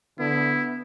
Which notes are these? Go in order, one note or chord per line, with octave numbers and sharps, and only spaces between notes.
D3 B3 E4